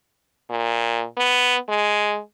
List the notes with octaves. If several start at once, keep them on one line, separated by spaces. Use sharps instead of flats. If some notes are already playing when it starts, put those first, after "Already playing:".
A#2
B3
G#3